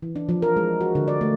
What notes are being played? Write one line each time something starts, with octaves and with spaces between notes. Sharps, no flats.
E3
D4
F3
A#4
G#3
F#4
D3
D5
A3